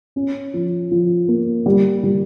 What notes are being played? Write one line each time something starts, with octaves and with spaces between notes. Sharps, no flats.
C#4
F3
F3
A#3
G3
G3